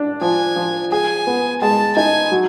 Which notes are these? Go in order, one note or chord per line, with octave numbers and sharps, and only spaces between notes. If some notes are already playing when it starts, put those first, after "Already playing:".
Already playing: D4
F3 G#5
F3
G#4 G#5
B3
G#3 A5
D#4 G#5
F#3